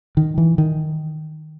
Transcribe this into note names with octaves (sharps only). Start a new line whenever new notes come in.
D#3
E3
D#3